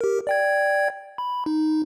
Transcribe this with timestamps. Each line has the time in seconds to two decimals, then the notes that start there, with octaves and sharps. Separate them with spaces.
0.01 G4 A#4
0.27 D5 G5 G#6
1.18 B5
1.46 D#4